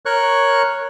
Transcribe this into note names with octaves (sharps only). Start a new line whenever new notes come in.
A#4 C#5 C#6 F#6